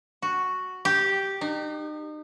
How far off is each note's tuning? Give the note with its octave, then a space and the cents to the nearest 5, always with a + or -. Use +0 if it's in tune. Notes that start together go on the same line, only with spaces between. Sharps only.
F#4 +0
G4 -5
D#4 -35